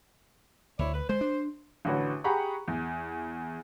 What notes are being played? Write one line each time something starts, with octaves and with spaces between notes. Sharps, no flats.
D2 E4 C#5 D5
B4
G#3 C5
D4
A1 D3 F#4 B4 C#5
G4 G#4 F#5 A#5 B5 C#6
E2